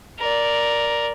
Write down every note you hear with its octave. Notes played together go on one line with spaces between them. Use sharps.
A#4 D5